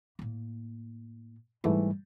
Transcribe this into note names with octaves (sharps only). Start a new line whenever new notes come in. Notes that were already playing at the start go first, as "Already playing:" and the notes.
A2 A#3
G#1 G#2 E3 G3 A3